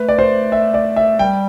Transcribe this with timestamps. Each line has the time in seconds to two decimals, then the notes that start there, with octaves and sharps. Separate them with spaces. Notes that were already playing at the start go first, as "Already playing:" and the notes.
Already playing: A3 B4
0.08 D5
0.19 C5
0.52 E5
0.74 D5
0.96 E5
1.19 G3 G5